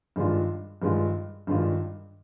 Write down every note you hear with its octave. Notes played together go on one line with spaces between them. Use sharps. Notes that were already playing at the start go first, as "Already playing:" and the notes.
G2 D#3 G#3 D4 F4
G2 D#3 G#3 D4 F4
G2 D#3 G#3 D4 F4